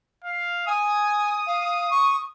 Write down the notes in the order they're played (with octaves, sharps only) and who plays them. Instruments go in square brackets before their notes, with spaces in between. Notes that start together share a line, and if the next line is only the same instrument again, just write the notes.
[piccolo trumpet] F5
[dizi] G#5 [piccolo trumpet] D#6
[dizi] F5
C#6